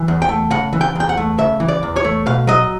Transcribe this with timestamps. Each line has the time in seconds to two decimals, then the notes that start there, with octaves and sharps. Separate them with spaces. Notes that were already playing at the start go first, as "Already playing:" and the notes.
Already playing: E3
0.08 E2
0.22 G5
0.29 A3
0.51 C#3 F#5
0.73 E3
0.81 G5
0.96 E2 G5
1.09 F#5
1.17 A3
1.39 C#3 E5
1.60 E3
1.68 D5
1.83 E2
1.96 C#5
2.04 A3
2.26 B2 F5
2.47 F#3 D#5